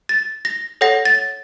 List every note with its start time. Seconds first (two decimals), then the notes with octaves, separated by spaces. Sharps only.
0.09 A6
0.45 A#6
0.81 A4 C#5 F#5 A#6
1.05 A6